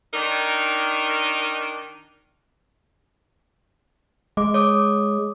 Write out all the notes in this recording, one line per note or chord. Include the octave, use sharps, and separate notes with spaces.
D#3 D4 D#4 A#4
G#3 D6
C#5 D6 D#6